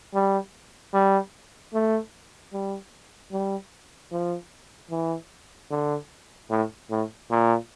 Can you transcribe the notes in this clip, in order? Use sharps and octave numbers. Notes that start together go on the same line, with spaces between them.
G3
G3
A3
G3
G3
F3
E3
D3
A2
A2
A#2